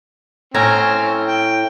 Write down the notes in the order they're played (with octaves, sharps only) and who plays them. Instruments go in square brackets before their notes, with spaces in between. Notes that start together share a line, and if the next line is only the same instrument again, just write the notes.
[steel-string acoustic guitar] A2 G#5 A#5 [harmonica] C4 C#4
[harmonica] G5